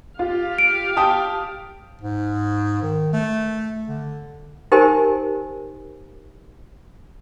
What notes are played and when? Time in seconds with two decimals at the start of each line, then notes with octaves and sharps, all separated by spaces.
0.19 F4 G4 F5
0.59 D7
0.97 G5 A5 D#6
2.01 G#2
2.82 D#3
3.13 A3
3.88 D3
4.72 D#4 G4 A#4 C5 G#5 B5